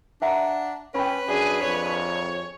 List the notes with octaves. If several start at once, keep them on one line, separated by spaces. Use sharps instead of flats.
D4 E5 F#5 A#5
C#4 B4 G5 B5
F#2 D4 G#4
F2 C#5